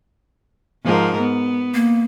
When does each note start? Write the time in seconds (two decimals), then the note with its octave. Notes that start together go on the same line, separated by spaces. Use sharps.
0.84 G#2 F3 A#4
1.20 B3
1.74 A#3